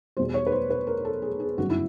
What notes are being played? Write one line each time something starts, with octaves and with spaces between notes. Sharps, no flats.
E2 B2 G3 C5
C#5
B4
C5
B4
A#4
A4
G#4
G#4
G1 F#2 C#3 F#4
E4